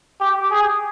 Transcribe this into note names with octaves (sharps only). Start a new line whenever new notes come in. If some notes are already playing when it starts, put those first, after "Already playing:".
G4
G#4